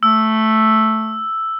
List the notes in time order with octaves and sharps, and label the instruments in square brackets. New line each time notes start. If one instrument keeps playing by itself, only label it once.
[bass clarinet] A3 [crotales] E6